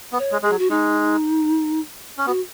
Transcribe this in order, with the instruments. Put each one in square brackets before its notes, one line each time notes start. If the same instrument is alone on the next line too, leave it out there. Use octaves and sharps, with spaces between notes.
[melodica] B3
[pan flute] C#5
[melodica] G#3
[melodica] G#3 [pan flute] G#4
[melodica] F#3
[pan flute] F#4
[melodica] G#3 [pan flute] D#4
[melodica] C#4
[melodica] B3 [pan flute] F#4